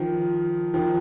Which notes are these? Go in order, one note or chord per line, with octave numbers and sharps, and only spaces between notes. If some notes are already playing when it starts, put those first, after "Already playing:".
Already playing: D#3 F3
D#3 F3